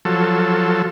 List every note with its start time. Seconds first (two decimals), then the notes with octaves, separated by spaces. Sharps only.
0.05 F3 F#3 A4